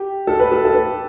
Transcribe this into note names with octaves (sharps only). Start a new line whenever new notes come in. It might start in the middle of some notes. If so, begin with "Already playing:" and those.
Already playing: G4
A4
B4
A4
A4
B4